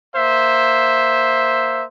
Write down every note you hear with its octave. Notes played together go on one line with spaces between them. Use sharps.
A#3 C5 E5